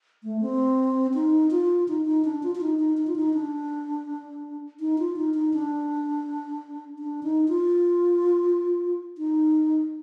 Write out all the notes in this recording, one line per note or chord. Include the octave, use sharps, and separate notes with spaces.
A3
C4
D#4
F4
D#4
D#4
D4
F4
F4
D#4
D#4
D#4
F4
D#4
D4
D#4
F4
D#4
D#4
D4
D4
D#4
F4
D#4